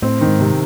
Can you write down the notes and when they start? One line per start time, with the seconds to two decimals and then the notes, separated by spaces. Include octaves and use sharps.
0.02 A2 C4
0.21 D#3
0.27 G#2
0.40 C3